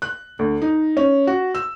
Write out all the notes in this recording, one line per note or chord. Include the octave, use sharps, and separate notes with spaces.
F#6
D2
D#4
C#4
F#4
E6